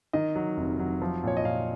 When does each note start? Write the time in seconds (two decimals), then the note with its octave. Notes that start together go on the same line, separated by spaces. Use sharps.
0.13 D#3 D#5
0.35 F#3
0.57 F1
0.79 F#3
1.02 F3
1.23 A#2 C#5
1.37 D#5
1.45 A#2 F5